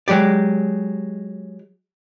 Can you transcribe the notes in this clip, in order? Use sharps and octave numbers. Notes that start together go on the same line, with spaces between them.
F#3 G#3 G4 D5